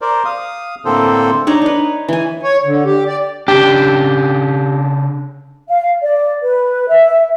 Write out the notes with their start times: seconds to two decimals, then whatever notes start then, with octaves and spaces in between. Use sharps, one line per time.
0.01 A#4 C5 D5
0.25 F5 D#6
0.85 A2 D3 A#3 C4 A4 C5
1.47 D4 D#4 C#5
1.61 D#4 B4
2.08 E3 G#5
2.43 C#5
2.65 D3
2.85 G4
3.07 D5
3.48 C#3 D4 G4
5.69 F5
6.02 D5
6.42 B4
6.88 E5